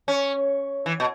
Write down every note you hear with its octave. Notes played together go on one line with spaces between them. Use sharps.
C#4
E3
B2